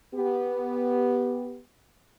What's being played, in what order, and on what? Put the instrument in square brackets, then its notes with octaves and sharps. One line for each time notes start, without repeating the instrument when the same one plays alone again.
[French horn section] B3 G4